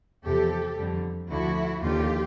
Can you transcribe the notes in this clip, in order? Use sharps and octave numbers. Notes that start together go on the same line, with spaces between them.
E2 C3 F3 G4 A4
F2 D3 G3
D2 D3 F3 E4 F#4
D#2 D3 F3 F4 G4